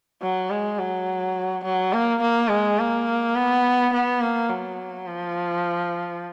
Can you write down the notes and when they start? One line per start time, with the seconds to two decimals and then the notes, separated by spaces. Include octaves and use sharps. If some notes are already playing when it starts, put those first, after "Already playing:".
0.22 F#3
0.50 G#3
0.79 F#3
1.64 F#3
1.92 A#3
2.21 A#3
2.49 G#3
2.79 A#3
3.35 B3
3.93 B3
4.21 A#3
4.49 F#3
5.07 F3